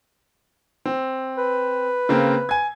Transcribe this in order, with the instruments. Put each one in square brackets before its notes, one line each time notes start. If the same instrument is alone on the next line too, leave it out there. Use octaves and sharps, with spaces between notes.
[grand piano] C4
[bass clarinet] B4
[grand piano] C#3 A#3 C4
G#5 G#6